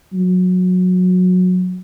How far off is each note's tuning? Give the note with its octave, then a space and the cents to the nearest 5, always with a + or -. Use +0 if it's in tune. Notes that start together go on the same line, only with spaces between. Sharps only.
F#3 -20